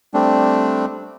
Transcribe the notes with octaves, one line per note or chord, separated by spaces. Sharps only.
G3 A3 C4 D4